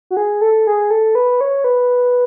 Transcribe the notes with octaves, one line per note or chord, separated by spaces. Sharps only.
F#4
G#4
A4
G#4
A4
B4
C#5
B4